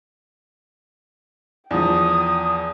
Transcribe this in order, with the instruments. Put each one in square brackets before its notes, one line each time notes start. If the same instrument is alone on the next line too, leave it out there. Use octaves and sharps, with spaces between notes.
[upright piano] E2 F3 [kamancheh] G5 D#6